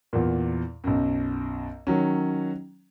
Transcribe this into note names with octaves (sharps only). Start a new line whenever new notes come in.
E2 A#2
B1 F#2
D#3 F#3 C#4